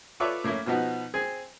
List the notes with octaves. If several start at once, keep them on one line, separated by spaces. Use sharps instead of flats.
F4 A4 B4 C#5 D5 E5
A2 A#3 C#4 E4
B2 F3 B3 D#4 F#4
C4 G#4 G#5